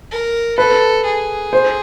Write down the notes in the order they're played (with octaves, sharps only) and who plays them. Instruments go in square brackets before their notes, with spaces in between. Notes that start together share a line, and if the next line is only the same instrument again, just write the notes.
[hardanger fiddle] A#4
[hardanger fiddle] A4 [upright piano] B4
[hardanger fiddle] G#4
[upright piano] C5